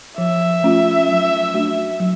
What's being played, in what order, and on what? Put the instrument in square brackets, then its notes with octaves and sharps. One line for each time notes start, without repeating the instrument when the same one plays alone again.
[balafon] F3 [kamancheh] E5
[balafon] A3 C#4 F4
F#3
A3 D4 F#4
F#3